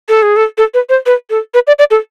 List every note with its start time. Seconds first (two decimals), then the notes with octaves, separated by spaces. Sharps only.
0.09 A4
0.22 G#4
0.36 A4
0.58 A4
0.74 B4
0.89 C5
1.06 B4
1.30 A4
1.54 B4
1.67 D5
1.79 D5
1.91 A4